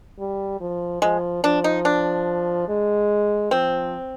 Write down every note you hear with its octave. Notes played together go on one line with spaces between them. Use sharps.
G3
F3
F3 G#3
F3 D4
D#4
D4
G#3
F3 C4